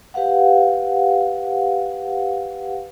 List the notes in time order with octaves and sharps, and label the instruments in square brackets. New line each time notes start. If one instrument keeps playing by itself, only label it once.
[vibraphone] G4 B4 F5 F#5